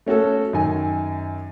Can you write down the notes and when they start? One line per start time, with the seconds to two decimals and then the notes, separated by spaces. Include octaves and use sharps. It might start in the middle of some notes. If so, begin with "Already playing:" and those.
0.06 A3 C#4 F#4 A4
0.53 F#2 D#3 G#5